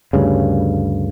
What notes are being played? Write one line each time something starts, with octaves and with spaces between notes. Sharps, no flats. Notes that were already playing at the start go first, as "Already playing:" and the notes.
D2 G2 C#3